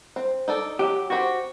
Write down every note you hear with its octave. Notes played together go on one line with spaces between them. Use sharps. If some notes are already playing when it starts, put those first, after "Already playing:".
C4
D#4 A4 D5
F#3 G4
C4 F#4 G4 C5